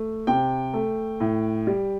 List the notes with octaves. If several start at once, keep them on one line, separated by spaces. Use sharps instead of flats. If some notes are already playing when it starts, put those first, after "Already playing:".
Already playing: A3
C3 G5
A3
A2
G3